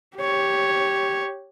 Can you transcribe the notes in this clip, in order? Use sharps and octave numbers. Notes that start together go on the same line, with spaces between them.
G4 C#5